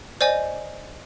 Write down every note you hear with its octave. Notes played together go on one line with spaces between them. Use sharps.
C5 D5 D#5 G#5